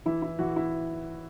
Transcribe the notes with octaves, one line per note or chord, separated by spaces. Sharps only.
E3 E4
E4
E3 F#4
E4